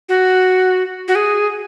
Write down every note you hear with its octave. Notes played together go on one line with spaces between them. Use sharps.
F#4
F#4
G#4